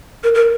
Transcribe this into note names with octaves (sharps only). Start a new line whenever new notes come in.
A#4
A#4